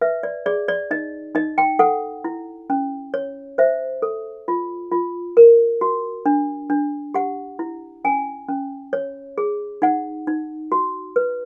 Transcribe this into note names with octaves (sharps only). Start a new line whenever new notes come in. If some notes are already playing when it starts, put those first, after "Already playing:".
B4 E5
D5
G#4 D5
D5
D#4 D#5
D#4 D#5
G5
A4 F#5
E4
C#4
C#5
C5 E5
A4
F4
F4
A#4
F#4
D4
D4
G4 F#5
E4
C#4 G#5
C#4
C#5
G#4
D#4 F#5
D#4
F#4
B4